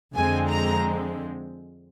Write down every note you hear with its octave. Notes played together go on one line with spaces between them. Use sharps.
F2 D3 F3 G#3 C4 G#5
A#5